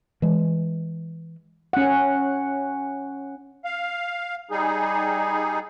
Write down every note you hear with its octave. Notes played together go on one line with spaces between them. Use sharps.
E3 G#3
C#4 F#5
F5
G3 D#4 G#4